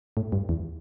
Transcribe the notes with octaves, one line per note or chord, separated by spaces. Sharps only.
A2
G2
E2